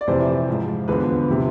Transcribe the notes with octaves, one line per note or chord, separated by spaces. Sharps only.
D5
F2 C3 E3 C5
G#2 F3
E2 D3 F3 B4
C3 F3